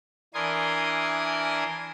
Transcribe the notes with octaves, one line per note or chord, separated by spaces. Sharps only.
E3 D4 A#4 G#5 C6 D#6